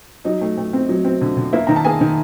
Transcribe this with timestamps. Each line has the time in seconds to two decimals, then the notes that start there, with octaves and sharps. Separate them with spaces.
0.25 F#3 D#4 D#5
0.41 A3
0.58 A3
0.73 C4
0.89 F#3
1.05 C4
1.21 D3
1.37 D3
1.53 A#3 E4 E5
1.67 D#3 A#5
1.76 A5
1.85 A#3 G#4 G#5
2.01 D#3